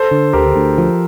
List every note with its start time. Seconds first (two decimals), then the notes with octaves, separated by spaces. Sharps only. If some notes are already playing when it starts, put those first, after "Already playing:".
Already playing: A4 C5
0.11 D3
0.33 D2 G4 A#4
0.56 D2
0.78 F3